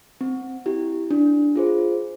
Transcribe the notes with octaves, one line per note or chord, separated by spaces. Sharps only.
C4
E4 G4
D4
F4 G#4 C5